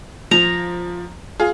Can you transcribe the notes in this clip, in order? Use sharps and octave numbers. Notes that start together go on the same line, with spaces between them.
F3 A#5
F4 G#4